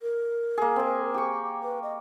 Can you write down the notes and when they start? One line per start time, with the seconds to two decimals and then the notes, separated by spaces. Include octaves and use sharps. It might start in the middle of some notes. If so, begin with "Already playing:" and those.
0.02 A#4
0.58 A#3 G#4
0.76 C4 G#5
1.14 G4 C#6
1.63 B4
1.83 D#5